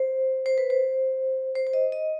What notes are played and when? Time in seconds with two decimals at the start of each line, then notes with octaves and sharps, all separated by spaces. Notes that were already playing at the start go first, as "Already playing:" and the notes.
Already playing: C5
0.46 C5
0.58 B4
0.70 C5
1.55 C5
1.67 C5
1.73 D#5
1.92 D#5